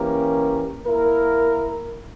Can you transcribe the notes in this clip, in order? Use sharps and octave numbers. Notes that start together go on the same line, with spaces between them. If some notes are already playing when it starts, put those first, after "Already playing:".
Already playing: E3 A#3 C#4 G4 A#4
A#3 E4 A#4